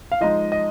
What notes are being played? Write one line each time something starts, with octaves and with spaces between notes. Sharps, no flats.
F5
F3 G#3 D#4 D#5
D#5